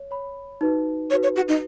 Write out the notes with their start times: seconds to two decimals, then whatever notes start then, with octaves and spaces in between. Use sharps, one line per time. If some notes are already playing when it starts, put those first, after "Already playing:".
Already playing: C#5
0.11 C#5 B5
0.61 D#4 F#4 B4
1.10 D#4 C#5
1.13 F#4 B4
1.23 C#5
1.36 F#4
1.48 D#4